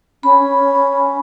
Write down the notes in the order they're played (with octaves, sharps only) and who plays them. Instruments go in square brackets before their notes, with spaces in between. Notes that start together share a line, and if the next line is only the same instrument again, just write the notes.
[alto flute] C#4 [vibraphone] B5